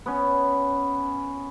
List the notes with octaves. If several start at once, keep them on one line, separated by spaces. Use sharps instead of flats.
B3 C#4